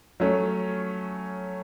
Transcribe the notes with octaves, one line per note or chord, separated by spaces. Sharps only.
F#3 A3 C#4